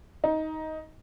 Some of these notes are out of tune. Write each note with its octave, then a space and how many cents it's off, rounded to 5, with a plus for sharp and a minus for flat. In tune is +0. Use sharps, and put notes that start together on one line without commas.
D#4 +15